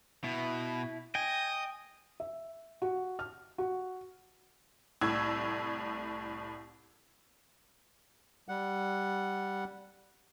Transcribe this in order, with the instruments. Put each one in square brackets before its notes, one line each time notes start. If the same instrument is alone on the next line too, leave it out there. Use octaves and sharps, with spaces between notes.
[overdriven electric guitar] B2 [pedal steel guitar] E4
[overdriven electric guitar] D#5 [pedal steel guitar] G5 G#5
[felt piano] E5
F#4
F6
F#4
[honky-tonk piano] C2 A2 E6 G#6
[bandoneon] G3 F#5